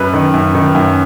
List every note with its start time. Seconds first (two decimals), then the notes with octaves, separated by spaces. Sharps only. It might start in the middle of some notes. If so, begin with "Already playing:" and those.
Already playing: F#2 B4
0.14 D#3
0.34 F#2
0.55 D#3
0.75 F#2